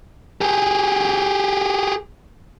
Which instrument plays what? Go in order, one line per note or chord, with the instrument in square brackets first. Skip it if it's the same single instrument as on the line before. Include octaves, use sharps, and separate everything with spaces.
[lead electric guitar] G4 G#4